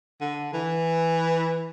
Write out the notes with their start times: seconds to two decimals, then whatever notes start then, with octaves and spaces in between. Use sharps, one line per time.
0.21 D3
0.53 E3